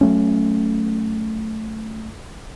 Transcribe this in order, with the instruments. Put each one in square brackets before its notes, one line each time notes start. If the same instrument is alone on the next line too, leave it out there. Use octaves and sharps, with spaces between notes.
[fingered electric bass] F#3 A3 C#4